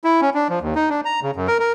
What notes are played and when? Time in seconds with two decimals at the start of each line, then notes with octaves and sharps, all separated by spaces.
0.04 E4
0.21 C#4
0.34 D4
0.49 F3
0.61 D#2
0.75 D#4
0.90 D4
1.05 A#5
1.23 C#3
1.36 F#2
1.48 A#4
1.60 A#4